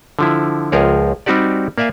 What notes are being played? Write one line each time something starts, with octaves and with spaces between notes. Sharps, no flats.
D3 F3 E4
C#2 F3 G#4 A#4 C#5
G3 C4 D#4 F#4 G4 D5
A#3 D5 E5 F5 G#5